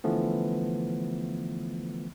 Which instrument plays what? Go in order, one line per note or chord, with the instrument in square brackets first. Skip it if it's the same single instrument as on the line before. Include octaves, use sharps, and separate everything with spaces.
[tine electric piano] D3 E3 F3 A3 B3